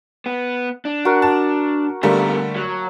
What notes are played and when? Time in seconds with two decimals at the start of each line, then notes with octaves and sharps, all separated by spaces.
0.26 B3
0.85 D4
1.05 F#4 A#4
1.22 A5
2.03 B2 D3 G3 A3 A#3 A#4 A5
2.56 F#3